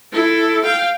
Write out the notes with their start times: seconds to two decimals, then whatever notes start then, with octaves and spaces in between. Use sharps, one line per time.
0.13 E4 A4
0.65 F5 G5